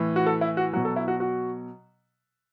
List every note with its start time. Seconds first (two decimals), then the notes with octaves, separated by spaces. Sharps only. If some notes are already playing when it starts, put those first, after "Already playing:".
Already playing: A2 E3
0.16 F#4
0.26 A4
0.41 E4
0.57 F#4
0.73 F#3 F#4
0.77 B2
0.85 A4
0.96 E4
1.08 F#4
1.20 F#4